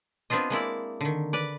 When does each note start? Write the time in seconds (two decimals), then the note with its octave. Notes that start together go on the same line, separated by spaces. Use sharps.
0.30 B3 C4 D4 F4 D#5
0.50 G#3 A#3 E4 D5
1.01 D3 D#3
1.33 B4 D5